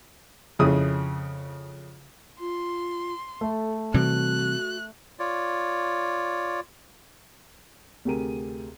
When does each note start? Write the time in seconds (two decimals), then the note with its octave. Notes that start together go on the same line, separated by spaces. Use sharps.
0.59 F2 C#3 E4 G#4 D#6
2.40 F4 C6
3.41 A3 A4
3.94 C3 E3 G3 F#4 F#6
5.19 F4 C#5 D5
8.05 D2 C3 G4 G#4 A#4 D#7